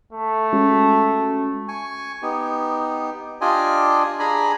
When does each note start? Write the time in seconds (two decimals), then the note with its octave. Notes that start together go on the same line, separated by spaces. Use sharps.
0.12 A3
0.53 G#3 C#4 F#4
1.68 G#5 C#6
2.22 B3 D#4 G4
3.41 D4 F4 G4 D5 D#5 G#5
4.19 D4 G#4 G#5 A#5 B5